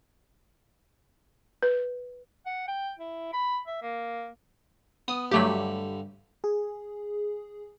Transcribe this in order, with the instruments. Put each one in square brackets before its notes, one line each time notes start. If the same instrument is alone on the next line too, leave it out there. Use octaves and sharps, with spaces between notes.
[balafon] B4
[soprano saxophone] F#5
G5
E4
B5
E5
A#3
[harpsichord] B3 [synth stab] D#6
[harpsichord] G2 D3 B5 [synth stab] F#3 A3 G4
[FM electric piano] G#4